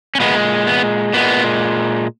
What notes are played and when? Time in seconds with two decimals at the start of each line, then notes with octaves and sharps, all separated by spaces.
0.15 C#4
0.20 A#2 G#3 B3
0.67 B3
1.13 A#2 G#3 B3